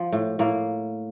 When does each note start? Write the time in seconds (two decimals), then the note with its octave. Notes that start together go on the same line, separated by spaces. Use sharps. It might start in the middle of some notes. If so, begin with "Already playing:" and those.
Already playing: F3
0.12 A2
0.39 A2 A#3